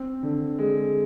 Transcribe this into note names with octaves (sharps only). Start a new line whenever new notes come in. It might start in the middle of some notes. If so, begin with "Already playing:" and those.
Already playing: C4
D3
G#3